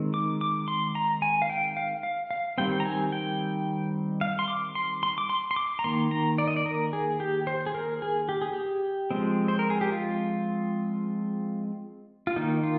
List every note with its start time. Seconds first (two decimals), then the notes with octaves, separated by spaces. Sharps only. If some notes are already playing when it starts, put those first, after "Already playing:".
Already playing: D#3 G#3 C4
0.14 D6
0.41 D6
0.68 C6
0.95 A#5
1.22 G#5
1.42 F5
1.50 G5
1.77 F5
2.03 F5
2.31 F5
2.58 D#3 G3 C4 G5
2.80 A#5
2.85 G#5
3.12 G5
4.21 F5
4.39 C6
4.48 D6
4.75 C6
5.03 C6
5.18 D6
5.30 C6
5.51 C6
5.56 D6
5.79 A#5
5.84 D#3 A#3 C6
6.11 A#5
6.38 D5
6.47 D#5
6.56 D5
6.66 A#4
6.93 G#4
7.20 G4
7.47 C5
7.66 G#4
7.75 A#4
8.02 G#4
8.29 G4
8.42 G#4
8.53 G4
9.11 F3 G#3 C4
9.48 C5
9.59 A#4
9.70 G#4
9.81 G4
9.92 F4
12.27 F4
12.36 D#3 A#3 D#4
12.63 F4